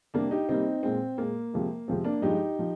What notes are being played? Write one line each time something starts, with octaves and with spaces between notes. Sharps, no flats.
C3 G3 A#3 D4
D#4 G4
C3 G3 A#3 C4 D#4
A#2 G#3 C4
A#2 G#3 A#3
C3 F3 G#3
C3 F3 G#3 C4
A#3 D4
G2 F3 G#3 D#4 G4
F3